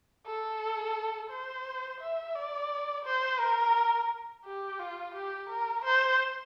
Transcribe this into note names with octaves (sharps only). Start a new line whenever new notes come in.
A4
C5
E5
D5
C5
A#4
G4
F4
G4
A#4
C5